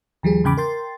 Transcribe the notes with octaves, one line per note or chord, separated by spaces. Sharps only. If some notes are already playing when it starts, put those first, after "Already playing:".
D#2 F3 G3 G#4
E2 G#2 C#3 G5 B5 D6
A#4 G5 C6 A6